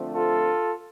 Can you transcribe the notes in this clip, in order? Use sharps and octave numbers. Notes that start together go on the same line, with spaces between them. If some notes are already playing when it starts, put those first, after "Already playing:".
Already playing: D3 F3 A3 C4
F4 A4